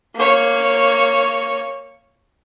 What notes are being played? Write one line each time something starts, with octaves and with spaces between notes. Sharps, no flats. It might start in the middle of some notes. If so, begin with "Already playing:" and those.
A#3 C#5